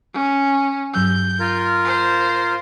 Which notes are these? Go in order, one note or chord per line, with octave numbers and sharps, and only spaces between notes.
C#4
G2 F#3 E6 G6
F4 A#4
C5